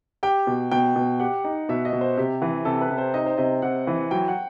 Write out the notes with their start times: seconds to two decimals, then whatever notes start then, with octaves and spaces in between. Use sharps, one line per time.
0.23 G4 G5
0.47 B2
0.71 B2 G5
0.96 B2
1.20 G4 F#5
1.44 D#4
1.69 B2 E5
1.85 D#5
1.93 B2
2.01 C5
2.17 C3 G4
2.42 E3
2.65 C3 A4
2.81 B4
2.90 C3
2.98 C5
3.14 D#4 D#5
3.26 C5
3.37 C3 D#5
3.62 C3 F#5
3.87 E3
4.11 F#3 G5
4.28 F#5